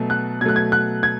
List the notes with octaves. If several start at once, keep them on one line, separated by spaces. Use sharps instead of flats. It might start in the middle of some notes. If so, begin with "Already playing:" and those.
Already playing: B2 F#3 A3
F#6
B2 F#3 A3 F#6 G#6
G#6
F#6
G#6